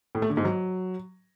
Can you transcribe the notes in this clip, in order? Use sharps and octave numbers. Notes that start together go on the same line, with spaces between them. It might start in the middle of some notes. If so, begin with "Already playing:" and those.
A2
A3
D3
G#2
F#3